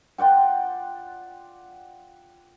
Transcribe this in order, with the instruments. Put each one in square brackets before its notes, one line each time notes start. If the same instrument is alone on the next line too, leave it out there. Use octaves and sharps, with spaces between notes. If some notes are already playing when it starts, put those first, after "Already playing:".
[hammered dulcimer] F4 D5 F#5 G5